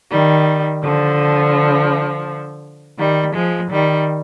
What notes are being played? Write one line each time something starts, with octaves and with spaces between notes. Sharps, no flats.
D#3 G3
D3 F3
D#3 G3
F3 G#3
D#3 G3